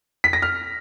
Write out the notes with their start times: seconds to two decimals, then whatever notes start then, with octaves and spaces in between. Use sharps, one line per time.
0.24 B6
0.33 A#6
0.42 F6